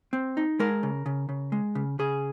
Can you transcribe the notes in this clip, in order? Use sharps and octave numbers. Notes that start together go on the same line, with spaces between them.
C4
D#4
G#3 A#4
C#3
C#3
C#3
G#3
C#3
C#3 G#4